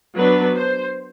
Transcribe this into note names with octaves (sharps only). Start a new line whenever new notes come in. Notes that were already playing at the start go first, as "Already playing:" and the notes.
F#3 B3 D4 B4
C5